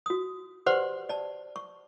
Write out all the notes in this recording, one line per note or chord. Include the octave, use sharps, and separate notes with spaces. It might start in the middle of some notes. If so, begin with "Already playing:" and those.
F#4 D#6
G4 B4 C5 D5 F#5 C6
D5 A5
C#6